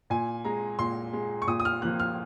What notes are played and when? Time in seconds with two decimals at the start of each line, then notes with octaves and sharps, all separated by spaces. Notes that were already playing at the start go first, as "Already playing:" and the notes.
0.10 A#2 G#5
0.44 G#3 A#5
0.79 A#2 C6
1.13 G#3
1.42 C#6
1.47 A#2 D#6
1.60 D#6
1.65 F6
1.82 F3 A#3 F#6
2.00 F6